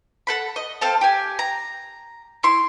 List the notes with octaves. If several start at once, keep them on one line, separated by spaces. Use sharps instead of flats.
A4 F#5 B5
D#5
C4 A4 F5 A5
G4 G#5
A#5
E4 C6